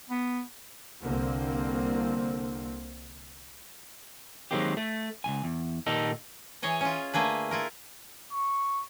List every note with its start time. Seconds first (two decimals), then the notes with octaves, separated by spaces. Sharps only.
0.10 B3
1.01 C2 D3 A#3 C4
4.51 D#3 F#3 G#3 A#3 C4 G4
4.77 A3
5.24 C#2 F#2 G#5
5.44 E2
5.87 A#2 D#3 A#3 D#4 G4 A4
6.62 E3 G#4 C#5 D#5 A#5
6.81 C#4 F4
7.13 D3 A3 A#3 G#4 B4
7.51 E4 F4 A#4
8.32 C#6